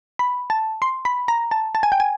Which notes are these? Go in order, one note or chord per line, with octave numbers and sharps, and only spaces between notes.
B5
A5
C6
B5
A#5
A5
A5
G#5
G5
G#5